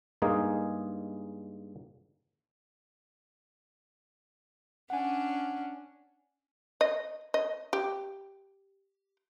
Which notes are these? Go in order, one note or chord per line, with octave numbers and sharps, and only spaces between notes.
G2 G#3 A#3 D#4 G#4
C#4 D4 F#5 G#5
D#5
D#5
G4